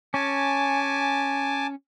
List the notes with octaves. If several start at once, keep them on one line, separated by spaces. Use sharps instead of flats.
C#4 G#5 A5 D6